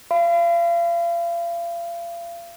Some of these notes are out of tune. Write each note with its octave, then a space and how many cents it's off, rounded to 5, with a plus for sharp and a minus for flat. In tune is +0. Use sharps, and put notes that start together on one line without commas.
F5 -40 B5 +35